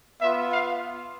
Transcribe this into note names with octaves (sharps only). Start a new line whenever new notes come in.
B3 F4 E5
F5